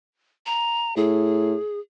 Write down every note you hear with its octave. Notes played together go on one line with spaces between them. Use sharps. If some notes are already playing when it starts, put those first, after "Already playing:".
A#5
A2 G#4